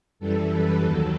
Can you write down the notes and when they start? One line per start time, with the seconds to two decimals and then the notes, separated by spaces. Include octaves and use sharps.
0.19 F#2 E3 G3 A4
0.52 B4
0.84 D#2 D#3 F#3 A4